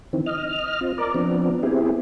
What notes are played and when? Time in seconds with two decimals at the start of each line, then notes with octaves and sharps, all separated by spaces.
0.13 D#3 E3 C4
0.26 D#5 F6
0.81 C4 F4
0.98 A#4 D5
1.14 F3 B3 C4 D4
1.63 B3 C4 E4 G4 G#4